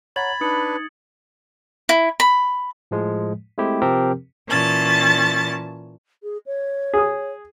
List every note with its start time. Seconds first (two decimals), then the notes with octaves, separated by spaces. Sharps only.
0.16 C#5 F#5 A#5 B5 G#6 A6 F#7
0.41 D4 D#4 B4 D#6 C#7
1.89 E4
2.20 B5
2.91 A2 F3 G#3
3.58 G#3 A3 C4 E4 G4
3.82 C3 F3 C4 G4 A#4
4.49 A#2 E3 C#4 A5 A6
6.23 G#4
6.46 C#5
6.94 G#4 D#6